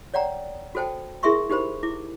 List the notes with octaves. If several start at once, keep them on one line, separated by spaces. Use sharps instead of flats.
C#5 D5 F#5 G5 A#5
F#4 A4 C5 G5 A5
E4 G#4 A#4 E5 C6 C#6
D#4 G4 A#4 C5 B5
E4 D6